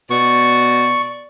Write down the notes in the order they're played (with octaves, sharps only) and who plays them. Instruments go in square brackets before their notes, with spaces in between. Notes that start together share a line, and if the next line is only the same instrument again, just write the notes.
[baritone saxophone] B2 [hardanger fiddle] D5 [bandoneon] C#6